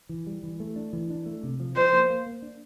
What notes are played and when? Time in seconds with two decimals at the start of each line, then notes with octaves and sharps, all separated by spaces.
0.09 E3
0.27 G3
0.43 E3
0.60 A3
0.76 D4
0.93 E3
1.10 D4
1.26 A3
1.43 C3
1.60 F3
1.76 F3 C5
1.93 A#3
2.10 A#3
2.26 A#3
2.42 D4